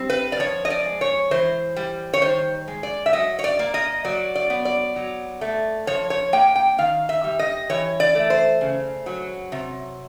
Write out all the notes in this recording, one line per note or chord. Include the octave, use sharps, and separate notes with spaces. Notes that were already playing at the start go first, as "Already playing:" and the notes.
Already playing: G3 C4
B4
D5
F3 C#5
D#5
D5
G#3
C#5
E3 C5
G3
C#5
D#3 C5
G#3
D5
E5
F#3 D#5
C#5
D5
A#3
D#5
F#3 D5
D5
B3
D5
F#3
A3
F3 C#5
C#5
A#3 G5
G5
D#3 F5
E5
G3
D#5
E3 C#5
D5
A3
C5
C#3
F#3
C3